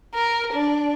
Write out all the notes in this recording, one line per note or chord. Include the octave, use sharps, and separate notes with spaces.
A#4
D4